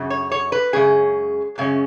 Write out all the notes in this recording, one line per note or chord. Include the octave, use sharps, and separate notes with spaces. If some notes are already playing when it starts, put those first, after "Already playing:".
Already playing: F#2 C#3
C#5
C#5
B4
F#2 C#3 G#3 C#4 G#4
F#2 C#3 G#3 C#4